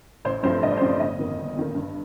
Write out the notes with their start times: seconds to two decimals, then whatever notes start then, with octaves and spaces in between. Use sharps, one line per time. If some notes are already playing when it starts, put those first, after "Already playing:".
0.25 A1 C5
0.43 G2 F3 A3 C4 C5
0.63 A1 D#5
0.70 D5
0.78 C5
0.81 G2 F3 A3 C4 D5
1.00 G1 D#5
1.19 F2 D#3 A#3
1.38 G1
1.56 F2 D#3 A#3
1.75 G2